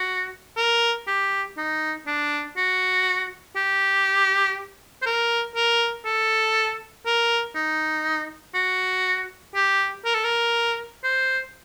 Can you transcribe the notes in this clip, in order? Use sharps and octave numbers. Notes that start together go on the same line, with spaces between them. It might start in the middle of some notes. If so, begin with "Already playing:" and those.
Already playing: F#4
A#4
G4
D#4
D4
F#4
G4
C5
A#4
A#4
A4
A#4
D#4
F#4
G4
A#4
A4
A#4
C5